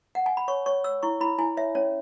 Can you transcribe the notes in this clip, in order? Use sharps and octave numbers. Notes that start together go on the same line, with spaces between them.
F#5
G#5
B5
C#5 C#6
C#5 C#6
C#5 E6
E4 C#6
E4 B5
E4 G#5
C#5 E5
C#4 C#5